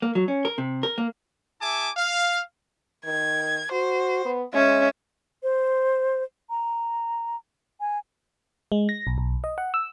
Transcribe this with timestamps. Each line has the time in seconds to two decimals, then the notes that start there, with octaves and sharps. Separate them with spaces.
0.02 A#3
0.15 F#3
0.28 C#4
0.45 A#4
0.58 C3
0.83 A#4
0.98 A#3
1.61 E4 G#4 E5 G#5 A5 D6
1.97 F5
3.05 D#3 G#6
3.72 F#4 C5
4.25 B3
4.54 G#3 C#4 E5
5.43 C5
6.50 A#5
7.80 G#5
8.72 G#3
8.89 A#6
9.07 B1
9.18 B1
9.44 D#5
9.58 F#5
9.74 E6